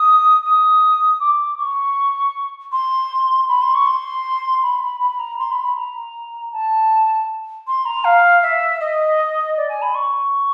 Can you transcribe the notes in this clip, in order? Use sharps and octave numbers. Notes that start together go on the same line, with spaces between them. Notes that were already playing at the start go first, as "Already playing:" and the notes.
Already playing: D#6
D#6
D6
C#6
C6
B5
C6
C#6
C6
B5
B5
A#5
C6
B5
B5
A#5
A5
C6
A#5
F5
E5
D#5
D5
G#5
B5
C#6